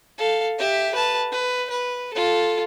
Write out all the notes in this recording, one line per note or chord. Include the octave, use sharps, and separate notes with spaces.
A4 F5
G4 E5
B4 A5
B4
B4
F4 A4